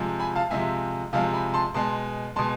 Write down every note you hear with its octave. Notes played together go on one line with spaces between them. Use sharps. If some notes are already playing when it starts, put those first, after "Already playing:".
Already playing: C3 F3 G#3
G#5 B5
F5 A5
C3 F3 G#3 E5 G#5
C3 F3 G#3 F5 A5
G#5 B5
A5 C6
B2 G#3 A5 C6
B2 G#3 A5 C6